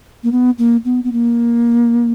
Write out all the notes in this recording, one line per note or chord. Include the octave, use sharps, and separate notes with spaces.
A#3
B3
A#3
B3
B3
A#3